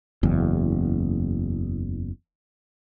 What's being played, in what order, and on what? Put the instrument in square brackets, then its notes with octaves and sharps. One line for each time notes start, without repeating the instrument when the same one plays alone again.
[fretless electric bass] F#1 E2